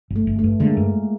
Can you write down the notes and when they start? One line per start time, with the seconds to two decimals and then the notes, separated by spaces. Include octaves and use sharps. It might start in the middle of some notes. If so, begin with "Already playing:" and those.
0.10 G1
0.16 A3
0.27 G1
0.39 A3
0.44 G2
0.60 D3 G#3 A#3
0.77 G2